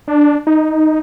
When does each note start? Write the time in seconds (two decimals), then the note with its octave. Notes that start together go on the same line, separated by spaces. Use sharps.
0.08 D4
0.47 D#4